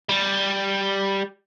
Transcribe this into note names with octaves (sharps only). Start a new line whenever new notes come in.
G3